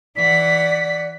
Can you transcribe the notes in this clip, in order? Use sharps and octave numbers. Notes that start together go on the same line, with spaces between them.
E3 D5 F#5 B6